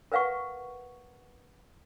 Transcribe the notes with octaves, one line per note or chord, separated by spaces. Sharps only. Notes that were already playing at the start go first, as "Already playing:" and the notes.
A#4 B4 F5 F#5 C#6